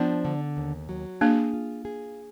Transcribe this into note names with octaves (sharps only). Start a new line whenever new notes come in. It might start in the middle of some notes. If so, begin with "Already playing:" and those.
Already playing: F3 B3 D4
D3
D#2
F#3
A#3 D4 G#4
F4
G#4